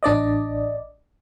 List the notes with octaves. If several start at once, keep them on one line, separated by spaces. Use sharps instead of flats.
A1 D4 D5 D#5